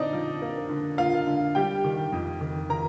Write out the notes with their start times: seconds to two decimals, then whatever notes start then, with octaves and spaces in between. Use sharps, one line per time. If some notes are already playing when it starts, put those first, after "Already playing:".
Already playing: D3 C4 D4 D#4 D5 D#5
0.13 F3
0.42 A#3
0.69 D3
0.98 A#3 F4 F5
1.27 D3
1.55 G3 G4 G5
1.85 D#3
2.12 F2
2.41 D#3
2.70 D#3 A#4 A#5